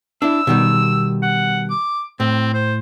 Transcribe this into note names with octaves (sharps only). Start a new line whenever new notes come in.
D4 E4 E6
B2 D#3 G3
F#5
D6
A2 C4
C5